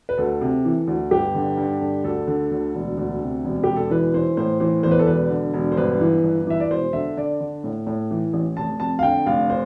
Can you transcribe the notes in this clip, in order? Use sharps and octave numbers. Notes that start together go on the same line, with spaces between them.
B4
D2 A4
C3
E3
D2
G1 G4
D3
G2
D3
D2 A4
D3
D2
E1
D2
C3
E1
E1 G4
A4
E3 B4
E3 C5
A2 C5
E3 C5
E2 C5
B4
A4
E1 B4
D3
E1
C5
G1 B4
E3
G1
E3 E5
D5
E1 C5
D3 E5
D3 D5
D3
A2
A2
E3
A1
F1 A5
F2 A5
F5
D3 G5
F1 F5
C5